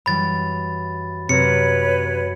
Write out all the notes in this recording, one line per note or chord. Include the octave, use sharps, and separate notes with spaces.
F#2 E3 G3 B5 A6
F#2 C3 A#4 B4 C#5 A#6 C#7